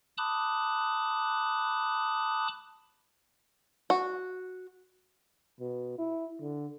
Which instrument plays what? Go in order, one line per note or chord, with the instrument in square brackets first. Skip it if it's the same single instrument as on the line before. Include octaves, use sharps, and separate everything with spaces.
[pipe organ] A5 B5 D6 D#6 F#6
[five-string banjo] F#4
[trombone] B2
E4
D3